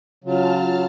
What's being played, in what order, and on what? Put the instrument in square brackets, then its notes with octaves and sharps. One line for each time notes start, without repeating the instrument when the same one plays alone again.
[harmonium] C#3 F#3 [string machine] F4 A5 F6